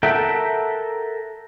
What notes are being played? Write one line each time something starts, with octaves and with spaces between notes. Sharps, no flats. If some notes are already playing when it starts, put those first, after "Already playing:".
A4 A#4 E5 F#5 G5